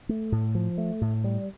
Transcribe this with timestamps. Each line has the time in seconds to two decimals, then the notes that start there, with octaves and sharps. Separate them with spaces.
0.09 A3
0.32 A2
0.55 F3
0.78 A3
1.01 A2
1.24 G3